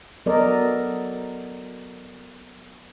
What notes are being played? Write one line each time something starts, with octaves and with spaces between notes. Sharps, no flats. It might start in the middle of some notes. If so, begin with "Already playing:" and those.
F#3 B3 A4 A#4 D5 D#5